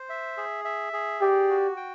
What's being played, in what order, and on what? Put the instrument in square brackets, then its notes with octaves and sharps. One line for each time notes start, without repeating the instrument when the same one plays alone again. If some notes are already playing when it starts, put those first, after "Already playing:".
Already playing: [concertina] C5
E5
G#4
E5
G#4
[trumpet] G4 [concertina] D5
[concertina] F#4
G5